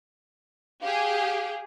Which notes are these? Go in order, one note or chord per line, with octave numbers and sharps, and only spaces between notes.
G4 G#4 F5